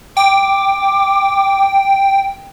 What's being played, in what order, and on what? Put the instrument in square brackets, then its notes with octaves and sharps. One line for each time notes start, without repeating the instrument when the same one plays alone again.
[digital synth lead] G5 [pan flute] D6